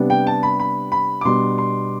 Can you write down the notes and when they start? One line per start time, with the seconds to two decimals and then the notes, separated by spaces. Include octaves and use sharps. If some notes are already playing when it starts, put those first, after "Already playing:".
Already playing: C3 G3 B3 D4
0.10 G5
0.27 A5
0.43 B5
0.60 B5
0.92 B5
1.21 D6
1.25 B2 G3 D4 C6
1.58 C6